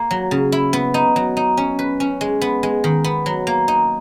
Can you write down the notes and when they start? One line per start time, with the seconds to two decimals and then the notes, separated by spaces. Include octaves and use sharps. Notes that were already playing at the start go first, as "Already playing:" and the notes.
Already playing: A#3
0.11 F#3
0.31 C#3
0.52 E4
0.73 B3
0.94 D#4
1.16 F#3
1.37 D#4
1.57 C#4
1.79 B4
2.00 C#4
2.21 G#3
2.41 B3
2.63 G#3
2.84 D#3
3.04 B3
3.26 F#3
3.47 A#3
3.68 D#4